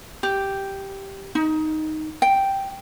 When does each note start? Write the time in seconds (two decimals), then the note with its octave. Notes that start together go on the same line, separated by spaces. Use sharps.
0.23 G4
1.35 D#4
2.22 G5